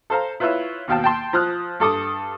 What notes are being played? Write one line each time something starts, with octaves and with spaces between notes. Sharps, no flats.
A4 C5 F5 A#5
E4 F4 B4 C#5 E5
D#2 B2 F5 G5 A5
G5 A5 C6
F3 D#6 F6 F#6
G2 A4 D6 D#6